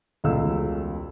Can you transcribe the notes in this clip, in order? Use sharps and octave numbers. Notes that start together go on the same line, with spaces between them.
E1 C#2 C#3 A3 F5 E6